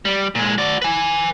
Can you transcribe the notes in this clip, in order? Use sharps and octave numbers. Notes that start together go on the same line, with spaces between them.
G3
A#2 G#3
F#4 D5
B4 G#5